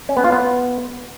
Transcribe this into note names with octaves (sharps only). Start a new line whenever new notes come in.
C#4
B3
F4
B3